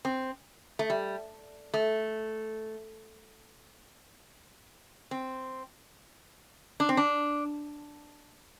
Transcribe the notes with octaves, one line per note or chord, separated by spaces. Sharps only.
C4
A3
G3
A3
C4
D4
C4
D4